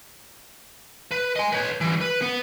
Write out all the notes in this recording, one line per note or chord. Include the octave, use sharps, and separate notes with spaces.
B4
D#5 G#5
B4 C#5
E3 G3
B4
B3